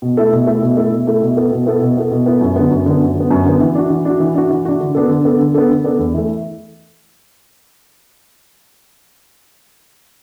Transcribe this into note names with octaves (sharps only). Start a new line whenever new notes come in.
B2
A3 E4 A4
B2
A3 E4 A4
B2
A3 E4 A4
B2
A3 E4 A4
B2
B3 E4 A4
B2
B3 E4 A4
B2
B3 E4 A4
B2
B3 E4 A4
F#2
D3 B3
F#2
D3 B3
F#2
D3 B3
F#2
D3 B3
E3
D4 F#4
E3
D4 F#4
E3
D4 F#4
E3
D4 F#4
D3
B3 D4 A4
D3
B3 D4 A4
D3
B3 D4 A4
D3
B3 D4 A4
E2
E3 A3